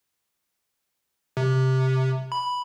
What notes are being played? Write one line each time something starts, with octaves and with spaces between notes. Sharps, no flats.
C3
B5